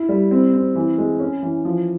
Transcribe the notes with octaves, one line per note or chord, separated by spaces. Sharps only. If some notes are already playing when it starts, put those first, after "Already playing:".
Already playing: E4
G3
C4
C4
E3
G#3
C#4
E3
F3